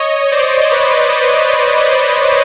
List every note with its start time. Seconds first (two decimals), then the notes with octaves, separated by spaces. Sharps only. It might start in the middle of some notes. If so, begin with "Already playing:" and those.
Already playing: C#5 D#5
0.32 C5 D5
0.71 B4 C#5